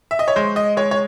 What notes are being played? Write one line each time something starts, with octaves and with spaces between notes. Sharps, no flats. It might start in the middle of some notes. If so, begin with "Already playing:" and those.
E5
D#5
C#5
G#3 C5
D#5
G#3 C#5
C#5